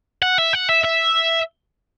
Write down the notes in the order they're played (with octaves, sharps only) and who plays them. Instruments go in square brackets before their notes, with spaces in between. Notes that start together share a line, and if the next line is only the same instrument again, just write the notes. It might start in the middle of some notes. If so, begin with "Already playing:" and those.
[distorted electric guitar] F#5
E5
F#5
E5
E5